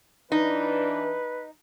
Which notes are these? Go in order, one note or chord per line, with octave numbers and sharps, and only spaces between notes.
E3 D4 D#4 B4